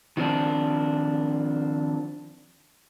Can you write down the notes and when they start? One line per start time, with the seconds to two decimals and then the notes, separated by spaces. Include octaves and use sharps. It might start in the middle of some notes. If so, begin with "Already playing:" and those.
0.17 D#3 F3 C4 D4